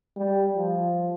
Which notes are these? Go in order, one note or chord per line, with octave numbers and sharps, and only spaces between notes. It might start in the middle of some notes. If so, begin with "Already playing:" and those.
G3
F3